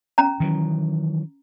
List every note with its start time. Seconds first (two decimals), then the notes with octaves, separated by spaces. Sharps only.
0.18 C#4 A#5
0.40 D#3 E3 F#3